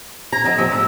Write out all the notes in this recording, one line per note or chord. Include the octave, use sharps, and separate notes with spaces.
A#5 G#6
D3 F3 D#4
D#2 F3 E6
G#2 E6